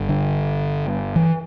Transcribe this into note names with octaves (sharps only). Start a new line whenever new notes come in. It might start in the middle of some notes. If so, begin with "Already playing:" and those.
Already playing: G1 G2
D3
E3